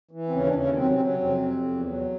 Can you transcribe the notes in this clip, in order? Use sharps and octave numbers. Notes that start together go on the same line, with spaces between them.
E3
C4
D#2 C#3 C#4
D4
D#2 C#3 C#4
C3 F#3 C4
C#4
C3 C4
F#3
C#3 C#4
F2 C3 C4
F2
E2
F#3